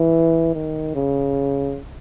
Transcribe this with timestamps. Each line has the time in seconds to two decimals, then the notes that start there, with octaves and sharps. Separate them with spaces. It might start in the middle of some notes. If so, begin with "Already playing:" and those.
Already playing: E3
0.55 D#3
0.95 C#3